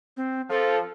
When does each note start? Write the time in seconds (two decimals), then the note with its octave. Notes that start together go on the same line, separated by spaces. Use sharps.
0.17 C4
0.50 F3 A4